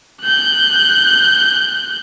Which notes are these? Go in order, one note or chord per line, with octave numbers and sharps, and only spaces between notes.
F#6 G6